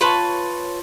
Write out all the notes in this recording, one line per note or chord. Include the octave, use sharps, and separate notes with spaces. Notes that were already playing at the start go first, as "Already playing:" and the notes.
F4 B4 C#5 A5